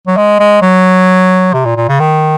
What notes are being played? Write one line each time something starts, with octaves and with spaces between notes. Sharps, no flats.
F#3
G#3
G#3
F#3
C3
A#2
A#2
C#3
D#3